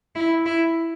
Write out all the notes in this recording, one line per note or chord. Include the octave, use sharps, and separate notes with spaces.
E4
E4